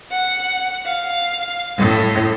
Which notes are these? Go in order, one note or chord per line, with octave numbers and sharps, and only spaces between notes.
F#5
F5
A2